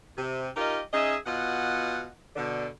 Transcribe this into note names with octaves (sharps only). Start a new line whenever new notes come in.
C3
D#4 F4 G4 A#4 D#5
C#4 D#4 G#4 D#5 E5
B2 F4 D#5 F#5
B2 D3